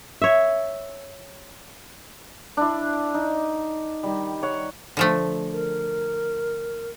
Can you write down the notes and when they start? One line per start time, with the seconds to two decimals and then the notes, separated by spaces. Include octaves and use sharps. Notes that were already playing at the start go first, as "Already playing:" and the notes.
0.22 C#5 E5
2.57 D4 E4
3.14 D#4
4.03 D#3 G3
4.43 C#5 F#5
4.97 D3 F3 A3
5.52 A#4